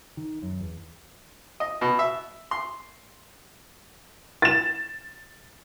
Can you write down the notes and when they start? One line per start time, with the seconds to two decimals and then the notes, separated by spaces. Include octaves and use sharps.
0.17 D#3
0.42 F#2
0.60 E2
1.60 D#5
1.81 B2
1.99 E5
2.51 C6
4.42 A6 E7